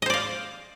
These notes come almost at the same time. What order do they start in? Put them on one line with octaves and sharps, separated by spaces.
D#5 C5 D5 F5